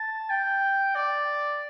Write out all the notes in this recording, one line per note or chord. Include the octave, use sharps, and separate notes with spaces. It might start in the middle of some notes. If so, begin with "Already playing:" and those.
Already playing: A5
G5
D5